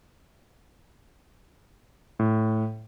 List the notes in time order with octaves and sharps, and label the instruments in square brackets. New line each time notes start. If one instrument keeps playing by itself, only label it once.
[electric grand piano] A2